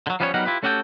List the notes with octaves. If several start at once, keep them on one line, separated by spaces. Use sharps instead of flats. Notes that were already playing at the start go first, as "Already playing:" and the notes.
D3 F#3
F3 G3 B3 C#4 E4 C#5
F#3 G3 B3 D#4 A#4 F#5
E4 F4 G4 B4
A3 C#4 F#4 G4 A4 G5